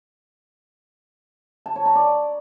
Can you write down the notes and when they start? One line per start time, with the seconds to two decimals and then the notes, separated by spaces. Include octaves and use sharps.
1.66 A5
1.76 C#5
1.85 A#5
1.95 D5